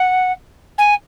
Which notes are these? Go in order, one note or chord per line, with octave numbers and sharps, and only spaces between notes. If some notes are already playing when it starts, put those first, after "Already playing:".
Already playing: F#5
G#5